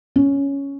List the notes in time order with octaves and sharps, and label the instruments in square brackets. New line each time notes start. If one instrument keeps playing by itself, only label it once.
[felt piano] C#4